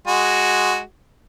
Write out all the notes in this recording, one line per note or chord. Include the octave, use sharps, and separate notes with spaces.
G#3 F#4